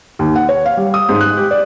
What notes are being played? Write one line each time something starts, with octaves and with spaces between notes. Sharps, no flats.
D#2
F#5
C#5
F5
G3
D#6
G#2
F#6
G4
D5